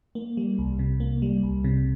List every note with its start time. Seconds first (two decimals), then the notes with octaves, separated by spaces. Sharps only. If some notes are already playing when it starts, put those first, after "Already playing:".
0.15 A#3
0.37 G3
0.58 C2
0.79 C3
1.00 A#3
1.22 G3
1.43 C2
1.64 C3